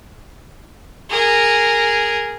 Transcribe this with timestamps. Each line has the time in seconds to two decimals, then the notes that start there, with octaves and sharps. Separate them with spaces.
1.10 G#4 A#4